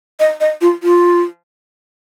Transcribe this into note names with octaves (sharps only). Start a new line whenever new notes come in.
D#5
D#5
F4
F4